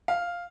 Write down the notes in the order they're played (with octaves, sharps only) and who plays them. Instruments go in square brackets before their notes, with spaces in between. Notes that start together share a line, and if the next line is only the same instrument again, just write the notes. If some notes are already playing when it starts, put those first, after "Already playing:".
[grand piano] F5